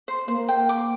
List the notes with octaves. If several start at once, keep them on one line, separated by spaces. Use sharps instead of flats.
C5
A#3 C5
G5
D6